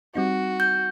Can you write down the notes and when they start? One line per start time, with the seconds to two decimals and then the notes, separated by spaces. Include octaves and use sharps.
0.16 G3 C4 D#4 F#4
0.60 G6